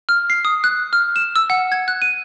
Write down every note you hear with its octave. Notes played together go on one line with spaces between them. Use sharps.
F6
C7
D#6
F#6
F6
E7
E6
F#5
G#6
F#6
D#7